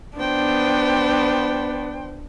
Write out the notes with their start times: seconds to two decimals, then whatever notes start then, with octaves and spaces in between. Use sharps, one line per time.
0.18 B3 D4 C5 G5